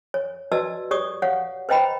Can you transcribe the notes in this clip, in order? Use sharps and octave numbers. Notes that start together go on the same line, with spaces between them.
C#5
F#4 B4 D5 D#5 A5 E6
G4 C#5 D5 C#6 D#6
C#5 F5 F#5
B4 C5 D#5 G5 A#5 B5